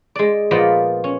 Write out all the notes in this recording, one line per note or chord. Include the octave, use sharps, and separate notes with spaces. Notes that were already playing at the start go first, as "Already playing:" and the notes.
G#3 D5
A#2 F3 B3 B4 D5 D#5
C#4